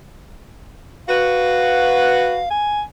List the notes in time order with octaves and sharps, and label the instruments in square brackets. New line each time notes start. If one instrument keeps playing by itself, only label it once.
[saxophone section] F#4 B4 [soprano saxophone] F5
[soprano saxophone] G#5